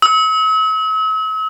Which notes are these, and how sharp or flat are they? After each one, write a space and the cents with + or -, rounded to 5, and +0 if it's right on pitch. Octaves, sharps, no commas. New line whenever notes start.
E6 -45